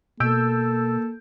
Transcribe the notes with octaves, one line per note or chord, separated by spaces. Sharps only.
B2 A#3 A4 E6 G6 D7